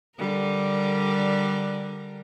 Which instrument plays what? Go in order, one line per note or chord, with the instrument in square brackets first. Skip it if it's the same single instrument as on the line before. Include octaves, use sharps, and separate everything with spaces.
[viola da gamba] D3 G3 A#4